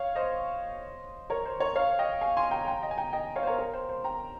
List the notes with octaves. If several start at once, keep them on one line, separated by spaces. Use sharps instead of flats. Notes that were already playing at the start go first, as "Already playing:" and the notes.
Already playing: C#5 F5
C5 D#5
A#4 C#5
C5
A#4 C#5
C#5 F5
D#5 G5
F5 G#5
G#5 C6
G5 A#5
G5 A#5
D#5 G5
G#5
G5 A#5
D#5 G5
C#5 F5
C5
A#4 C#5
A#4
C5
C5
G5 A#5